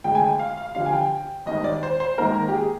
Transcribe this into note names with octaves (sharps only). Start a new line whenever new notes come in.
D2 D3 G#3 G5
G#5
G5
F5
F5
F2 D3 G3 D4 F5
G#5
G5
G#1 G2 D#3 D#5
D5
C5
C5
G#1 G#2 D#3 A#3 A#4
G4
G#4